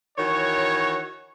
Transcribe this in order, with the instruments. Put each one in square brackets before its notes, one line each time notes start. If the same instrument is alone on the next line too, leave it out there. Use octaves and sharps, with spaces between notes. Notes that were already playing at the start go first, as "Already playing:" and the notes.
[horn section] D#3 E3 F#4 C#5